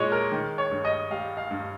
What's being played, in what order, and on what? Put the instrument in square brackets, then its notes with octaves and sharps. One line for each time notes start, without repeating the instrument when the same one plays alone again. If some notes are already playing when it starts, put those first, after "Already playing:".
Already playing: [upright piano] A#2 G#3 C#5 D#5
A#4
D#3
C#5
G2
D#5
G3 F5
F5
G2